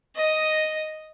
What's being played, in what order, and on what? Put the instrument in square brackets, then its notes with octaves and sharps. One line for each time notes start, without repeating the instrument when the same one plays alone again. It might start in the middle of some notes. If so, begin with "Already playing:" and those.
[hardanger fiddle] D#5